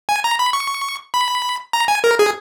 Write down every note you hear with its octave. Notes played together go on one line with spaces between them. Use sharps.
G#5
A#5
B5
C#6
B5
A#5
G#5
A#4
G#4